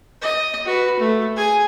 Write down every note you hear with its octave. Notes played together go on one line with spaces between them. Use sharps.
D#5
F#4 B4
A3
G#4 G#5